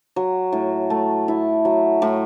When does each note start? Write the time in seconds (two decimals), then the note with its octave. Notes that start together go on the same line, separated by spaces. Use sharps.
0.16 F#3
0.52 A2
0.90 A3
1.28 E4
1.65 F#3
2.02 A2